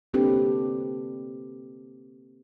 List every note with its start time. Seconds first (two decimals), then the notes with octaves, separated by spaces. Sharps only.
0.14 A#3 C4 D4 G4 A4 B4